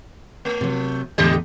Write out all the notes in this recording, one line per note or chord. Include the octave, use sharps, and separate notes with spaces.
A3
C3 F#3
E2 A2 D3 G3 G4 D#5